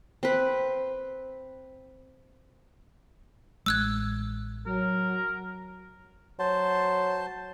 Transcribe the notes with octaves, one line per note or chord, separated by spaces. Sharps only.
C4 B4
A1 G#3 E6 F#6 G#6
F#3 A#4
F#3 C5 A5 C6